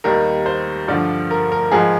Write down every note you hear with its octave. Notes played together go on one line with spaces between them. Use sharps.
D#2 D#3 G3 A#4
C5
G2 D3 F3 D5
A#4
A#4
G#2 F3 G#4